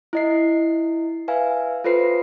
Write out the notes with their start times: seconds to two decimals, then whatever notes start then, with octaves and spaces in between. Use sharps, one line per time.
0.13 E4 D#5 C7
1.28 B4 E5 F5 G#5
1.84 F4 A4 B4 C5 C7